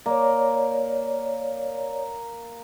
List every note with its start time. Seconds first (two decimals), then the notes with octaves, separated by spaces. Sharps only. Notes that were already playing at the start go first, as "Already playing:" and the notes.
0.06 A#3 C#5 D5